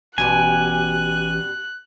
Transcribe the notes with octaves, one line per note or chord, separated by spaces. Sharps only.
A1 B2 G3 G4 G#5 F#6